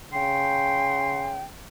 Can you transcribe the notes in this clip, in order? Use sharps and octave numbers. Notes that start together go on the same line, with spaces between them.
C#3 G5 C6